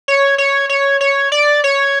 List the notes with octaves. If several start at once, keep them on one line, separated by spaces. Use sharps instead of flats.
C#5
C#5
C#5
C#5
D5
C#5